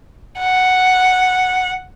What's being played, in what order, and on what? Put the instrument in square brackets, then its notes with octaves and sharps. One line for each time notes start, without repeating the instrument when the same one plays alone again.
[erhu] F#5